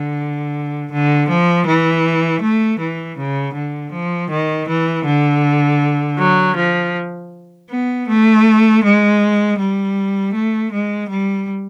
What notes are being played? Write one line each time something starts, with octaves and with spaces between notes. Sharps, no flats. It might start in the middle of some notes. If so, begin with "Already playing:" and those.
Already playing: D3
D3
F3
E3
A3
E3
C#3
D3
F3
D#3
E3
D3
F#3
F3
B3
A3
G#3
G3
A3
G#3
G3